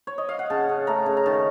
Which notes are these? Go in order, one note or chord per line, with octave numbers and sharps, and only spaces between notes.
C#5
D#5
F5
F#5
C#3 A5
C#3
A3 A#5
C#3
A#5
D#3 A5